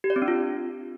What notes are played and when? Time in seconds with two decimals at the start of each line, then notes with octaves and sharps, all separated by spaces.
0.04 G4
0.10 D5
0.16 C4
0.22 D4
0.28 F4